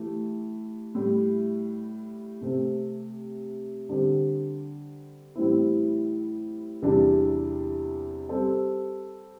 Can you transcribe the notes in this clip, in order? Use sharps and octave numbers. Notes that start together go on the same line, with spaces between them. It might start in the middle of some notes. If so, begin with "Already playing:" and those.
Already playing: E3 A3 G4
A2 G3 E4
C3 A3 C4
D3 G3 C4 G4
A2 E3 G3 C4 E4
E2 C3 E3 G3 D4
G3 C4 A4 C5